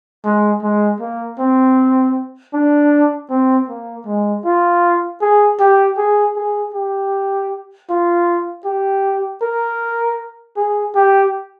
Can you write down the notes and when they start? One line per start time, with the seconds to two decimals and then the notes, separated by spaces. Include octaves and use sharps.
0.24 G#3
0.62 G#3
1.00 A#3
1.39 C4
2.54 D4
3.30 C4
3.69 A#3
4.06 G#3
4.45 F4
5.21 G#4
5.60 G4
5.98 G#4
6.36 G#4
6.74 G4
7.89 F4
8.65 G4
9.42 A#4
10.57 G#4
10.95 G4